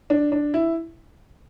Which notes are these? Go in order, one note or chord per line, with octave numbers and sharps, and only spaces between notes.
D4
D4
E4